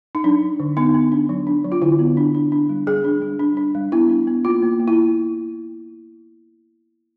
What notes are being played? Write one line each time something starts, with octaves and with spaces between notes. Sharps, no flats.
D#4
F#3 D4
D4
D3
B3 D#4
B3
D4
F#3
D4
F#3
F4
D3 E4
B3
D4
D4
D4
G3
G3 G#4
D4
G3
D4
D4
G3
B3 E4
D4
B3
A#3 F4
A#3
A#3
E4